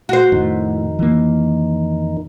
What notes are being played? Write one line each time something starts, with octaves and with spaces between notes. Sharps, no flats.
F#4 C5
F2 A2 D#3 D#4
E3 A#3